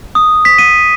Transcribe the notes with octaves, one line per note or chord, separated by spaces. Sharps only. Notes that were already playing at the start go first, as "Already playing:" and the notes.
D#6
B6
D#7